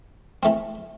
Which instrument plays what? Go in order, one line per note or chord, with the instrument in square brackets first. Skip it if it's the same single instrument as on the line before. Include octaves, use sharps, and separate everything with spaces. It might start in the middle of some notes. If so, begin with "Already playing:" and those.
[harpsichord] E3 A3 C4